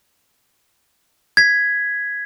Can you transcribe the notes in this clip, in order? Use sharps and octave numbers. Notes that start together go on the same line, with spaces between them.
G#6 B6